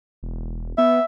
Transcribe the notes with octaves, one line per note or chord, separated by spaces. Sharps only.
E1
B3 E5